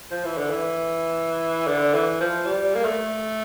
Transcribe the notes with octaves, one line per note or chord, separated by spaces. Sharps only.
F3
E3
D3
E3
D3
E3
F3
G3
A#3
A3